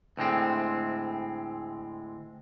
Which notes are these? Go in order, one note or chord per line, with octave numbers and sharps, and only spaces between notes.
D2 A2 G#3 C4